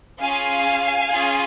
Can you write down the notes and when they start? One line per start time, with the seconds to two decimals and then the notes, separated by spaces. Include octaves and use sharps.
0.21 C#4 F4 G#4 F5 G#5
1.08 C#4 F4 G#4